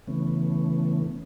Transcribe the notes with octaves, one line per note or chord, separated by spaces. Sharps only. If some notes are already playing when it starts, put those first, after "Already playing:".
C#3 E3 A3 B3 C#4